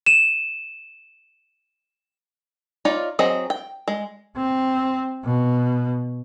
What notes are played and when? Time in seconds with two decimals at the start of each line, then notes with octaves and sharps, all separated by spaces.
0.06 D#7 E7
2.85 D#4 F4 C#5 D5
3.19 F#3 C4 G#4 D#5
3.50 G5
3.88 G#3
4.36 C4
5.25 B2